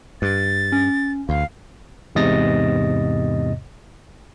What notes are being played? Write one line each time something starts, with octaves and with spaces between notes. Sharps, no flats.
G2 A6
C#4
D2 F5
E2 G#2 C3 D#5 A6 A#6